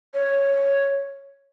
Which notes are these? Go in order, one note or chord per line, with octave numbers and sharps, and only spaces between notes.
C#5